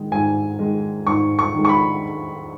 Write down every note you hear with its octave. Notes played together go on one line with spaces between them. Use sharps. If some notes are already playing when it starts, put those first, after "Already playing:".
Already playing: D#3 G#3
G#2 G#5
D#3 G#3
G#2 C#6
C#6
D#3 G#3
C#6
B5